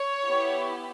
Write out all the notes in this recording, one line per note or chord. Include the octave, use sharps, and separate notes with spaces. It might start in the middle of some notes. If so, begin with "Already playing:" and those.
Already playing: C#5
B3 E4 G4